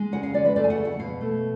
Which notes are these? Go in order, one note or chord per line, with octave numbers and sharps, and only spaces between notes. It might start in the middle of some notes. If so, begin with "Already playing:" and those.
Already playing: G#3
C#3 F#5
F5
G#3 D5
B4
A3 D5
G#5
F#5
C#3
F#5
B2 F5
A3